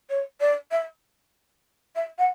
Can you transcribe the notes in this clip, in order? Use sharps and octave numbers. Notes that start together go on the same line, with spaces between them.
C#5
D5
E5
E5
F#5